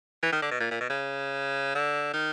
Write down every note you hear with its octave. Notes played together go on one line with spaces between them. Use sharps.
E3
D#3
D3
B2
A#2
A#2
B2
C#3
D3
D#3